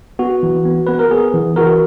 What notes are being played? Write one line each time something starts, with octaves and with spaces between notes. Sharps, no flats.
B3 F#4
E3
B3
B3 B4
A#4
B3 G#4
E3
E3 F#4 A#4